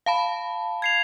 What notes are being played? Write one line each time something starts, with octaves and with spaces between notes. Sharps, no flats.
F5 A5 B5
G#6 C7 F7